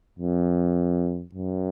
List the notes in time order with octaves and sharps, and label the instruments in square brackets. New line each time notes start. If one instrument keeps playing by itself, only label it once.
[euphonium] F2
F#2